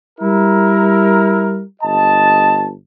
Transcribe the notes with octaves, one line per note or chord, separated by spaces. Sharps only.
G3 E4 A#4
G1 D#5 A5